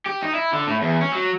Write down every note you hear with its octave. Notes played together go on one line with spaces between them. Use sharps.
G4
D#4
E4
D3
A2
E2
C#4
F#3